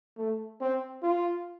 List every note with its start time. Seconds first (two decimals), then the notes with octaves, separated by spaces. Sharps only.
0.18 A3
0.61 C4
1.02 F4